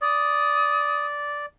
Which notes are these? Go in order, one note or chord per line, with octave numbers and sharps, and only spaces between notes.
D5 D#6